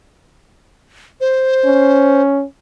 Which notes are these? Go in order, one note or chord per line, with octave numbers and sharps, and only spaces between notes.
C5
C#4